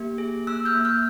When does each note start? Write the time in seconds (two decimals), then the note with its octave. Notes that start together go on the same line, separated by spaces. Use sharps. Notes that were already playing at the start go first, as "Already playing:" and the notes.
Already playing: A#3 G4
0.18 G#4
0.47 A#3 E6 F#6
0.65 F6 G6
0.75 A#3
0.85 F6 G6